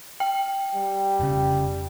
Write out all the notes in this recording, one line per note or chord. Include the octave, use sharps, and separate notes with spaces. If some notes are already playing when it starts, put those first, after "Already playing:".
G5
G3
F1 C#3